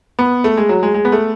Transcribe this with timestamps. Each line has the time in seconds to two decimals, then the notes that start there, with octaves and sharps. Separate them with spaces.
0.19 B3
0.44 A3
0.57 G#3
0.69 F#3
0.83 G#3
0.94 G#3
1.05 B3
1.12 A3